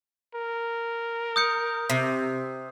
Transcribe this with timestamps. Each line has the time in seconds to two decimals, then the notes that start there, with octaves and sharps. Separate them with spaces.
0.35 A#4
1.36 D#6 G6 C#7
1.90 C3